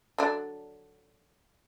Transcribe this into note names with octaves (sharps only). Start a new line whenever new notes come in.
D3 F#3 D4